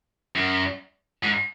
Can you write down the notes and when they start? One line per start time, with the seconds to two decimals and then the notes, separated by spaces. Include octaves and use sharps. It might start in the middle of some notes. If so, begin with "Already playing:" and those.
0.35 F#2
1.23 G#2